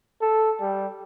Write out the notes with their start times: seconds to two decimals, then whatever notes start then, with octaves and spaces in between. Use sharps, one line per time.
0.21 A4
0.61 G3